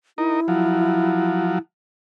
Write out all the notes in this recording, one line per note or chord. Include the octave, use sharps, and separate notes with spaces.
D#4 E4 A#4
F3 F#3